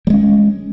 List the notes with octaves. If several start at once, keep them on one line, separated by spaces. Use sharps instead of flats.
G3 G#3 C#4